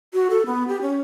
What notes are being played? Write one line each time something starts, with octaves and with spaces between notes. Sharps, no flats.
F#4
A4
B3
G4
C#4